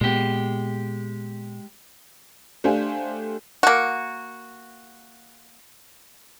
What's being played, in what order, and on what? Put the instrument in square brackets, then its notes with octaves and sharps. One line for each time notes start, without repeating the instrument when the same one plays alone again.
[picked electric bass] A#2 B3 [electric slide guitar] G#3 G4
[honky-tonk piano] A3 D4 G4 C5 F5 G#5
[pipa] A#3 F#4